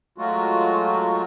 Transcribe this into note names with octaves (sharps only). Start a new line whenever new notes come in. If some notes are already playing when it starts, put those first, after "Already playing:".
F#3 G#3 A3 F4 F#4